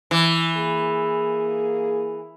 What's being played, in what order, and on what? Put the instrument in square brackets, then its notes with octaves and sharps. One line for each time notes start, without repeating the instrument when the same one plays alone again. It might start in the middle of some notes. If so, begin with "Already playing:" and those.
[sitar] E3
[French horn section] A#3 G#4